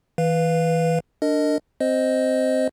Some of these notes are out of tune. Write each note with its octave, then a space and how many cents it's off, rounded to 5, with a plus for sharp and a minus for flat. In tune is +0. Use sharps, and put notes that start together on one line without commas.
E3 -25 B4 +0 F5 +0
D4 +0 A#4 -30 D#5 +0
C4 +0 C5 -5 D#5 +0